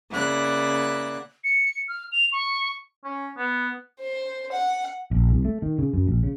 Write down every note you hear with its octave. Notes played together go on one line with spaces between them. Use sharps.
C#3 A#3 E4 D5 F#5 F#6
C#7
F6
F7
C#6
C#4
B3
C5
F#5
A#1
C2
A3
D#3
C#3
F#2
A#1
C#3